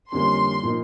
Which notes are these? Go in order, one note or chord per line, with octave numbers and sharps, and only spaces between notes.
F2 D3 G3 A#3 C#4 C6
A#2 F3 A#3 D#4